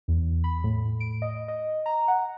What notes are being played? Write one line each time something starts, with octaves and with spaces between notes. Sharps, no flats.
E2
B5
A2
D7
D#5
D#5
A#5
F#5